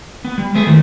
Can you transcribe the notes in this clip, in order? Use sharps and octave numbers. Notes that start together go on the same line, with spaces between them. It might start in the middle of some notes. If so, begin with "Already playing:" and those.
B3
G3
G#3 A3 B3 G#4 E5
D#3 E3 G3 A3